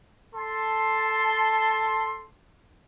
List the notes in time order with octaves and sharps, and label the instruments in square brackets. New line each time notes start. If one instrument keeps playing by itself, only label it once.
[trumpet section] A4 A5 C6